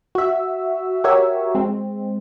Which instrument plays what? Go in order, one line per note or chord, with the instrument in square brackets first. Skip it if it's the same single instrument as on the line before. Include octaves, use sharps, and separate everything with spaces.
[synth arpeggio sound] F#4 E5
F#4 G4 A#4 C#5 E5
G#3 C4